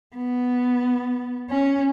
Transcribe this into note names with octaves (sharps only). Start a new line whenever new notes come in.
B3
C#4